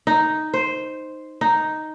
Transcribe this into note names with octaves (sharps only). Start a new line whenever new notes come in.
D#4
C5
D#4